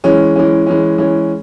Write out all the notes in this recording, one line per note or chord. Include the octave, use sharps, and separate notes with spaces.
E3 G#3 C#4
E3 G#3 C#4
E3 G#3 C#4
E3 G#3 C#4